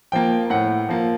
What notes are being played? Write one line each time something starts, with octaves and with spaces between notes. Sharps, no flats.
F3 A#3 G5
A2 F#5
F3 A#3